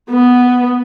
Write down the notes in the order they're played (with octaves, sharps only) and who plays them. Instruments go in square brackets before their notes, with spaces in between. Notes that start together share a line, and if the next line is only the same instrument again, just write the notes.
[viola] B3